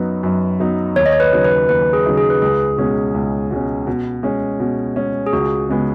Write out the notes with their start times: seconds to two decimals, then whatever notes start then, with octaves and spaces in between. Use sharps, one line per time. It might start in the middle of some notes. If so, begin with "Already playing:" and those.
Already playing: F#2 F#3 B3 D#4 B4
0.23 F#2
0.60 F#3 B3 D#4
0.96 D#2 C#5
1.06 D#5
1.13 C#5
1.20 B4
1.32 C#3 F#3 D#4
1.44 B4
1.69 D#2 B4
1.93 G#4
2.06 C#3 F#3 D#4
2.17 G#4
2.30 B4
2.42 C#2 G#4
2.78 B2 G#3 C#4
3.14 C#2
3.50 B2 G#3 C#4
3.87 B2
4.23 G#3 C#4
4.60 B2
4.96 G#3 C#4
5.26 G#4
5.33 C#2 F#4
5.69 C#3 G#3 B3